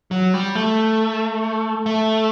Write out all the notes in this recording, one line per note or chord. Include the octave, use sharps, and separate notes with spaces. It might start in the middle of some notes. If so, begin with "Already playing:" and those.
F#3
G3
A3
A3